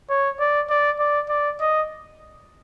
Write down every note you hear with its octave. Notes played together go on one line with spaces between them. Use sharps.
C#5
D5
D5
D5
D5
D#5